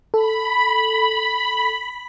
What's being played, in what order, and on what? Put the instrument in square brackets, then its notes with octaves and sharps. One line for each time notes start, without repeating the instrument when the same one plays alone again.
[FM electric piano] A4 [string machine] B5